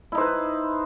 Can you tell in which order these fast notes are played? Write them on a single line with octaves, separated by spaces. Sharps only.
E4 D#4 C5 B4